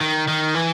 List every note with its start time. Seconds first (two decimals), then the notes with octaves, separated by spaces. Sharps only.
0.01 D#3
0.28 D#3
0.54 E3